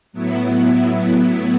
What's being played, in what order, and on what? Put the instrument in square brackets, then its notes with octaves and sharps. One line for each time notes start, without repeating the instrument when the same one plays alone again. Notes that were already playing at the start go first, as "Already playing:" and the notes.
[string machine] A2 F#3 B3 E4